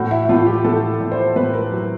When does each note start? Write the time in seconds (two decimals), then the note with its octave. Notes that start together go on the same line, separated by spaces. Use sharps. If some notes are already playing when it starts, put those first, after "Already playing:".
Already playing: A2 F#4
0.11 E4
0.29 A2 F4
0.47 G4
0.64 A2 A4
1.00 A2
1.12 C5
1.36 A2 B4
1.53 A#4
1.72 F#3